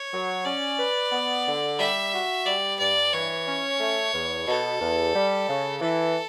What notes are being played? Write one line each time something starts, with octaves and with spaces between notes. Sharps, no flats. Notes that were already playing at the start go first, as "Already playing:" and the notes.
Already playing: C#5
F#3
C#4 D5
B4
B3
D3
G3 E5
F#4
G3 D5
G2 D5
E3 C#5
C#4
A3
E2
B2 A4
E2
G3
C#3
E3 A4